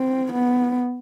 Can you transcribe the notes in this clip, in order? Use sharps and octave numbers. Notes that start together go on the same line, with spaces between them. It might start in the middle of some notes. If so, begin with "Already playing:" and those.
Already playing: C4
B3